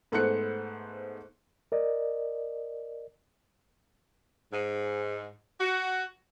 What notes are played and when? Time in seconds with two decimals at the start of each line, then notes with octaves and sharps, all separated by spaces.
0.12 G#2 A3 B3 C5 F#6 C#7
1.72 A#4 D5 D#5
4.53 G#2
5.61 F#4